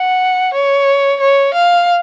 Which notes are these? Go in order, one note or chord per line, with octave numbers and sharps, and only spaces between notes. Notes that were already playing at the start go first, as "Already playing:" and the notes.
Already playing: F#5
C#5
C#5
F5